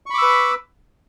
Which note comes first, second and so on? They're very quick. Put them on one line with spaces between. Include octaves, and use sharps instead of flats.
C#6 B5 D6 E6 B4